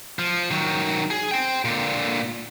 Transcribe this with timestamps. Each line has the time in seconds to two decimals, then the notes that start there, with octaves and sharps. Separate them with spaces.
0.19 F3
0.51 D#3 F#3
1.10 G#4
1.31 C5 G5
1.65 A#2 D3